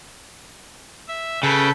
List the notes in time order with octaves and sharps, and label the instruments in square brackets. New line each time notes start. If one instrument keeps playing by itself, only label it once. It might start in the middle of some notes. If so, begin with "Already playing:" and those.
[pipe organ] E5
[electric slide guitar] C#3 [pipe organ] A4 B4 G6